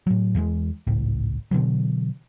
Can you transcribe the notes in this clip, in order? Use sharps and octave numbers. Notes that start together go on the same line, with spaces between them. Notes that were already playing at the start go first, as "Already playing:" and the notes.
A2 F#3
E2 E3 F3 G#3
G#1 C#2 A2
B2 D3 E3 F#3